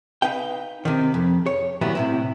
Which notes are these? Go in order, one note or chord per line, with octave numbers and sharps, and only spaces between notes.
D#4 B4 F5 G5
C3 D#3
F2
C#5
A#2 D#3 F#3 G3 B3 E4
A2 C3 E4